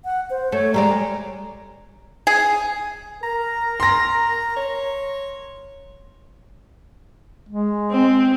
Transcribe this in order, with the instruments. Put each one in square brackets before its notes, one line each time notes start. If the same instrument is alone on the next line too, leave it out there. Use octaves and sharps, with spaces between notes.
[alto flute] F#5
C5
[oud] A3 [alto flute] C#5
[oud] G3 G#3 D5 [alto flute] A#5
[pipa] G#4
[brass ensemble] A#4 [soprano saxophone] A#5
[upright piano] C6 A#6
[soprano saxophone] C#5
[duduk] G#3
[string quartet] C4